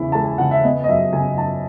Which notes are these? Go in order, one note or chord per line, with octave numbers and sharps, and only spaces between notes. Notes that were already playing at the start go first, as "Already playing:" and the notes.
Already playing: E2 C#3 E4
G#3 A5
G#5
C#3 F#5
E5
B3 D#5
D#5
F#2 E5
C#3 G#5
F#2 A5